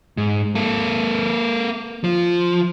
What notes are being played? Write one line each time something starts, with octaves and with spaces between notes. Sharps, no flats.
G#2
A#3 A4
F3